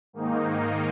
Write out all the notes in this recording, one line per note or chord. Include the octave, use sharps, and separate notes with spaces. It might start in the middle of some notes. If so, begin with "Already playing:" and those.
G#2 D#3 A#3 D#4